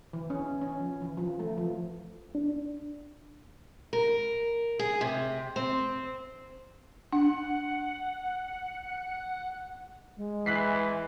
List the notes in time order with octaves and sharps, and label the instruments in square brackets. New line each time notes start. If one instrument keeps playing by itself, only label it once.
[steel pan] E3
C#4
C#4
F3
E3
F3
A3
F3
[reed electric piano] D4
[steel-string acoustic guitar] A#4
G#4
C3
C4
[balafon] D4 [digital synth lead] F#5
[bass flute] G#3
[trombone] E3 [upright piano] F#6 B6 C7